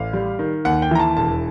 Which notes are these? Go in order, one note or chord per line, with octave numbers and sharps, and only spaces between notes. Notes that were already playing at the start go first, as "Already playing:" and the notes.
Already playing: A1 F5
G3
D#3
D#2 F#5
G5
E3 A#5
A5
E1 A5